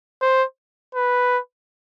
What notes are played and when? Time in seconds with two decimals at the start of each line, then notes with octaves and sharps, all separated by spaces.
0.22 C5
0.95 B4